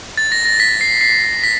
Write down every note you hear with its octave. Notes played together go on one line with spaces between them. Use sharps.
A6
A#6
A#6
B6
C7
C7
B6